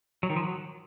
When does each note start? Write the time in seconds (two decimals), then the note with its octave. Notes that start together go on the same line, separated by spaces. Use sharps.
0.23 F#3
0.30 D#3
0.36 F3
0.43 F#3